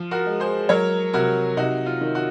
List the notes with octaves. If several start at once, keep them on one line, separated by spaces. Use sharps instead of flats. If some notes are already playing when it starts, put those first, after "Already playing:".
Already playing: F3
F#4 A#4
G#3
G#4 C5
F#3 A#4 C#5
C3 F#4 A#4
C3 D#4 F#4
F4
D#3
F#4